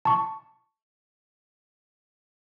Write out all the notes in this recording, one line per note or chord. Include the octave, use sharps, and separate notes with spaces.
A5 C#6